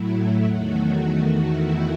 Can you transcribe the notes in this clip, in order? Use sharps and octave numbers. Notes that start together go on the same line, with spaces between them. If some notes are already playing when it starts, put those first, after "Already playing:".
Already playing: A2 F#3 A3 E4
E4
E2 D#3 F#3 A3 F#4
F#4
E2 D#3 A3
E4